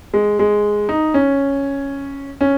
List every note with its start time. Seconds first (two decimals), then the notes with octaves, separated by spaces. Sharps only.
0.14 G#3
0.39 G#3
0.89 D#4
1.14 C#4
2.41 C#4